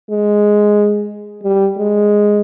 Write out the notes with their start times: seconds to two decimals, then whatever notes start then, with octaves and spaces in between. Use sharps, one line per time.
0.11 G#3
1.44 G3
1.78 G#3